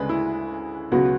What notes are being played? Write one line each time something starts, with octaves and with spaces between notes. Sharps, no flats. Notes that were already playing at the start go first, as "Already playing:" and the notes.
Already playing: D2 C#3 G#3 D4 B4
E4
C#2 B2 F#3 B3 F#4